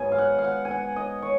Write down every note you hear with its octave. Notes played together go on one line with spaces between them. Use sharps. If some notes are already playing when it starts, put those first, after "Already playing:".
Already playing: G#2 F#3 B3 G#5
F5
F#5
F5
F#5
G#5
F#5
D#5
C#5